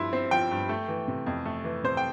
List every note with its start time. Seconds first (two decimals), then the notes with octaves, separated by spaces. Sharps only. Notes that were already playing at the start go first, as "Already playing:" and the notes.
Already playing: G2 F3 E4 C6
0.13 C4
0.31 F3 G5
0.51 G2
0.69 A3
0.88 E3
1.08 C3
1.26 F2
1.45 A3
1.64 E3
1.84 C3 C5
1.97 G5